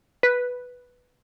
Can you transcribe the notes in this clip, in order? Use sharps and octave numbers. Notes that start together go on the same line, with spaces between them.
B4